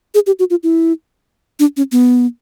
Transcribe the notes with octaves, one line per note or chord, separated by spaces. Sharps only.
G#4
G4
F#4
F4
E4
D4
C#4
B3